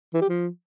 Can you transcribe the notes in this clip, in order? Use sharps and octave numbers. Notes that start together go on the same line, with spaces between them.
E3
G4
F3